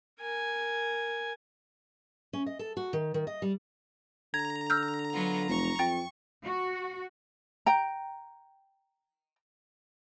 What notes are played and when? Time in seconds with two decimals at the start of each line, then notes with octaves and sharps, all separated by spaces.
0.20 A#4 G#5
2.33 C#4
2.46 D#5
2.59 A4
2.77 F#4
2.93 D#3
3.14 D#3
3.27 D#5
3.42 G3
4.34 D3 A#5 G#6
4.70 E6 F6 G6
5.13 F#3 B3 F4
5.49 F1 C#6
5.79 F2 G5 A6
6.45 F#4
7.66 G5 A#5